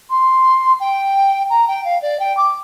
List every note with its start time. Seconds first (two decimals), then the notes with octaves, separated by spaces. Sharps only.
0.10 C6
0.80 G5
1.50 A#5
1.67 G5
1.85 F5
2.02 D5
2.20 G5
2.37 D6